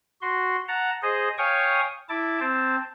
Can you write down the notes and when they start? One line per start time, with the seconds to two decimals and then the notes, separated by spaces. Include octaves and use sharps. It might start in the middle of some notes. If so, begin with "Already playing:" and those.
0.22 F#4 C6
0.68 F#5 A5 A#5
1.02 G#4 C5 D#5
1.38 C#5 F5 G5 G#5 C#6 D#6
2.09 E4 A5 D6
2.40 C4 C5 A5